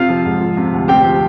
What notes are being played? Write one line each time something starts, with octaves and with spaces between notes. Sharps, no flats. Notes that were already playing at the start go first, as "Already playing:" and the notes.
Already playing: C3 C4 F4 F5
F3
G#2
F3
C3
D2
C4 G4 G5
F3